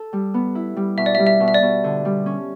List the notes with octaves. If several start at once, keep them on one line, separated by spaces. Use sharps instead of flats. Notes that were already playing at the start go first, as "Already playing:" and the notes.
Already playing: A4
G3
B3
E4
G3
B2 E5
D5
E5
G3
E5
B2
E5
D5
B2
D3
G3
C#4